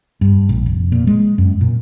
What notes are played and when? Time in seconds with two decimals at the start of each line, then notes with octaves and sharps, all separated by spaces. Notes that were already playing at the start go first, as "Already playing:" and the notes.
0.21 G2
0.49 A#1
0.66 F1
0.92 A#2
1.07 G#3
1.38 F#2
1.61 A#2